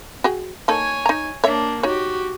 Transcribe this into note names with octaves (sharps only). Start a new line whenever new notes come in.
F#4 G#4 G5
A#3 D#4 A4 C#5 G#5
D#4 A#5
A#3 D4 C#5 E5
D#4 F#4 G4 C#5